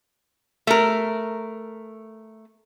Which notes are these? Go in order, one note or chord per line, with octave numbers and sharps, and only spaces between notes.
A3 A#4